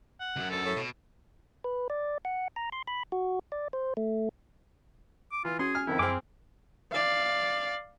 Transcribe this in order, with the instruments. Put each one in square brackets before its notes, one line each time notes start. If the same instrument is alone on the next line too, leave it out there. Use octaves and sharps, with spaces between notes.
[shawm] F#5
[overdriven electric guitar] C#2 F#2
[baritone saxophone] D2 [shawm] A4
[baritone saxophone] A2
[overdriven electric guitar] B2
[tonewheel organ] B4
D5
F#5
A#5
C6
B5
F#4
D5
C5
A3
[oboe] D6
[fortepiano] E3 [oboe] F4
[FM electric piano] C#4 F#4 [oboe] G#4 [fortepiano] C6
[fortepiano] G#5 F6
[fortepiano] F2 D#3 F3 [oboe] E4
[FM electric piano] F#2 F6 [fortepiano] C4 G#4 [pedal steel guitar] C6 D6
[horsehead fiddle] D5 F5